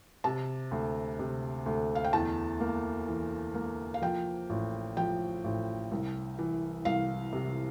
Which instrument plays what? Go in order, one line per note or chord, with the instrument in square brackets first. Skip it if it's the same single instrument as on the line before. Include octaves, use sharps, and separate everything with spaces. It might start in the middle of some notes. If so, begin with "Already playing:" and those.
[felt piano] C3 A5
D2
C3
D2
F5
G5
E2 A5
A#3
E3
A#3
F5
F3 G5
A1
F3 G5
A1
C2
E3
C2 F5
C3